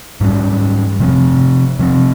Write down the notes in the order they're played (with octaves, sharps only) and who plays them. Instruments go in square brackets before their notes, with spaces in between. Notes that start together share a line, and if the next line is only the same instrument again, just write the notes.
[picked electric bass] G#2 G3 C#4
C3 F3 C4
C3 F3 C4